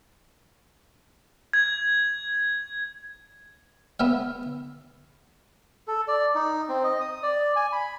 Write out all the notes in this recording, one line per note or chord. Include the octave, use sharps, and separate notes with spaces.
G#6
B3 E5 F5
A4
D5
D#4
C4
D#5
D#6
D5
G#5
B5